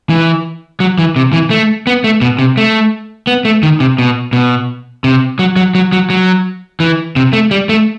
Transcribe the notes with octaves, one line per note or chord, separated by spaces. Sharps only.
E3
F#3
E3
C3
E3
A3
B3
A3
B2
C3
A3
B3
A3
D#3
C3
B2
B2
C3
F#3
F#3
F#3
F#3
F#3
E3
C3
A3
G3
A3